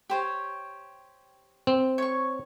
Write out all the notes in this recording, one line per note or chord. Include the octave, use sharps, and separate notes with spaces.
G4 C5 C#5
C4
C#5 C#6